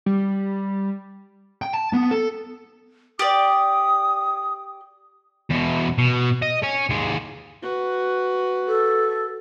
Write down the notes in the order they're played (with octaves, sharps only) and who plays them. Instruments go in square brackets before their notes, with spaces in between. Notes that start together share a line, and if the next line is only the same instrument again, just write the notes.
[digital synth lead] G3
[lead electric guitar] G5
A5
B3
A4
[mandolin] G4 D5 [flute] D#6
[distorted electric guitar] E2 B2
B2
D#5
C#5 G#5
D#2 G#3
[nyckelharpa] F#4 B4
[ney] A4